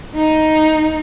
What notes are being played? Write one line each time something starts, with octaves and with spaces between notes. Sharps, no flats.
D#4